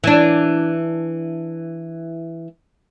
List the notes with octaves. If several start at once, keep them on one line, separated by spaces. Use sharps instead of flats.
E3 D4